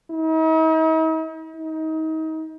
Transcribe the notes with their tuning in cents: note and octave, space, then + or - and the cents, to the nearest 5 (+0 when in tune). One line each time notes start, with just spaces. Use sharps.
D#4 +45
D#4 +30